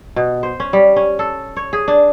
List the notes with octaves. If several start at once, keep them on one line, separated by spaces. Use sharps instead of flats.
B2
C5
C#4
G3
C#4
A4
C#5
G#4
D4